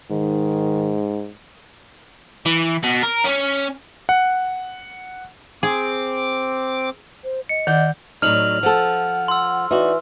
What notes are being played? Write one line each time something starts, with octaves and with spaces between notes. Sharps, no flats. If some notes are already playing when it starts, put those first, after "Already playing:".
G#2 D#3
E3
B2
A#4
C#4
F#5
C4 G#4 D6
C5
D#5 C#7
D#3 D5 F#5 G6
A2 F#3 D#4 D5 F6 F7 F#7
F3 A4 F#5
C6 E6
E3 D#4 F#4 D5